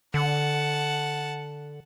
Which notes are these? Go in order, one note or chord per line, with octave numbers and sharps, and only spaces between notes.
D3 F#5 A5